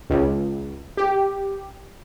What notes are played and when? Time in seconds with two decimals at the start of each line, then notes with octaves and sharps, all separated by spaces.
0.10 C#2
0.97 G4